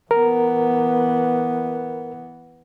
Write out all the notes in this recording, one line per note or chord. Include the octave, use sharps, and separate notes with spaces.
E3 B3 A#4